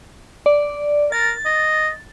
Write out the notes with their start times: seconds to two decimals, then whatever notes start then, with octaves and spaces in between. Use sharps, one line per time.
0.46 D5
1.12 A#4 A6
1.46 D#5